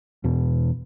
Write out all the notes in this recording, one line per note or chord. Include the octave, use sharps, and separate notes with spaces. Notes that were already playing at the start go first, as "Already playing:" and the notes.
E2 B2